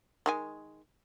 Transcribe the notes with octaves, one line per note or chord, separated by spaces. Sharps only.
D#3 G#3 G#5